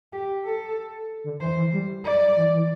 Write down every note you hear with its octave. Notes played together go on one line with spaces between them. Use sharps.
G4
A4
D3
E3 C5
E3
G3
D5
E3
E3